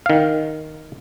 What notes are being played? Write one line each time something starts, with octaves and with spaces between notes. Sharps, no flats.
D#3 F5